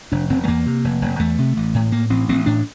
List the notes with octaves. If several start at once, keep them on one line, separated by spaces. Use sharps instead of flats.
F1 D4
F1 C4
A3
E2 A#3
C3
F1
F1
E2 A3
C3
A1
A2
A2 A#3
A1 C4
A1 C4
A2 D4